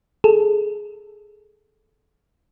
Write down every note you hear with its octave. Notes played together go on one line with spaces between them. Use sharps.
G#4 A4